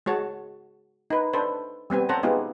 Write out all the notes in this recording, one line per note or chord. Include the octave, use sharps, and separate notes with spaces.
G#3 F#4 C#5 A5
D#4 B4
D4 A4 B4 C5
G3 B3 C4 G#5
C#4 A4 C5 F#5 A5 A#5
G#3 B3 D#4 F4 G4 G#4